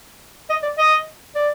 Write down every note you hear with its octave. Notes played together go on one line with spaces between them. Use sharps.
D#5
D5
D#5
D5